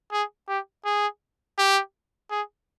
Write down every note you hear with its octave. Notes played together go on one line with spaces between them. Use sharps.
G#4
G4
G#4
G4
G#4